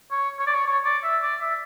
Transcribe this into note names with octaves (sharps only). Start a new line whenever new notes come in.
C#5
C#5
D5
C#5
C#5
D5
E5
D5
E5